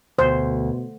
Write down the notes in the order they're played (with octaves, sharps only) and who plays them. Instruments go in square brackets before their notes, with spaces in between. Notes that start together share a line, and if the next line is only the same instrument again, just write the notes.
[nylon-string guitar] D2 [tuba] B2 [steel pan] C5